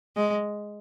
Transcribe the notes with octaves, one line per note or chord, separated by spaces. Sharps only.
G#3